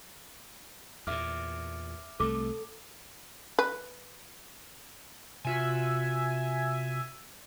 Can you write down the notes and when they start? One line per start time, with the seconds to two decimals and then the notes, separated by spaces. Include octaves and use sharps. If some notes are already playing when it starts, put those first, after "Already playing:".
1.07 E2 A#2 E5 D6 F6
2.20 C2 A3 A4 D6
3.59 B4
5.45 C3 F4 F#4 E5 G#5